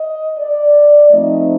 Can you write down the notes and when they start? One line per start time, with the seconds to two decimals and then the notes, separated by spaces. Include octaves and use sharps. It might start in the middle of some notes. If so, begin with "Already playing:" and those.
Already playing: D#5
0.39 D5
1.12 F3 A3 C4 D#4 D#5